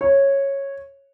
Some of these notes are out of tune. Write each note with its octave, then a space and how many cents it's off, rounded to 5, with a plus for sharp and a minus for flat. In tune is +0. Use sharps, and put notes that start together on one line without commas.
C#5 -10